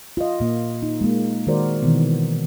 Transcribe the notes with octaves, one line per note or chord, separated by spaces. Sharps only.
F4 D#5
A#2 A#3
D#4
G#3 A#3
D#3 G#3 F#4 A#4 C5 D5
B2 D#3 E3 B3